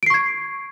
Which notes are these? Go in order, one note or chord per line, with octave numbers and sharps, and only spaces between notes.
C#6 G#6 C7 D7